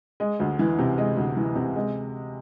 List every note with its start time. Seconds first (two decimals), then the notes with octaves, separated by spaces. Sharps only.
0.20 G#3
0.40 D2
0.59 E3
0.79 C3
0.98 G#3
1.17 D2
1.37 E3
1.56 C3
1.75 G#3